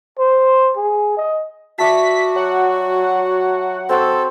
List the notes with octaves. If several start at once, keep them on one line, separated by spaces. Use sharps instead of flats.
C5
G#4
D#5
F#4 D5 E5 A5 B6
F#3 F#5
C4 F#4 A4 C5